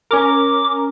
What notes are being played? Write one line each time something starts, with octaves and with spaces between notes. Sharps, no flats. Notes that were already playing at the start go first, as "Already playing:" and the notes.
C#4 A#4 D6